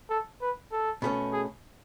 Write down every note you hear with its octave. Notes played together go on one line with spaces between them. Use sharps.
A4
B4
A4
B2 A3 C#4
G#4